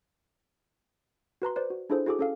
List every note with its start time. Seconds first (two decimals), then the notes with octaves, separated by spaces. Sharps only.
1.42 F#4 B4 A#5 C6
1.56 B4 C5 D5
1.70 F#4
1.90 D4 E4 F4 G#4 A4 C5
2.06 E4 F#4 G#4 A4 D6
2.19 C#4 A4 F5